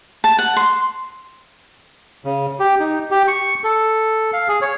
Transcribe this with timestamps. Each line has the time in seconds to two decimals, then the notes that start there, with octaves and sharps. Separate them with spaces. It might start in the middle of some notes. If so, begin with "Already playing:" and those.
0.24 A5
0.39 F#5
0.56 C6
2.25 C#3
2.60 G4
2.80 D#4
3.11 G4
3.28 C#6
3.64 A4
4.33 F5
4.48 G#4
4.62 C#5